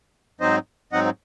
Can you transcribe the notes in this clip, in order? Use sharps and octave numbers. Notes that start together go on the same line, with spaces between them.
G#2 F#3 C4 D#4 C5 D#5
G#2 F#3 C4 D#4 D#5 F#5